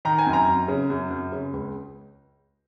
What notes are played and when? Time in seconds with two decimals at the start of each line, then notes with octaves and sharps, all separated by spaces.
0.05 D#3 A#5
0.18 G#5
0.26 F#2
0.33 A#5
0.47 F#2
0.68 C#3
0.90 F#2
1.10 F#2
1.32 C#3
1.53 C#2